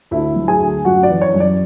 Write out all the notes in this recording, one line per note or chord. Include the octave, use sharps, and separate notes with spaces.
D2 E4 E5
F#3
G#4 G#5
D2
F#2 F#4 F#5
D5
E3
C#5
F#2
D5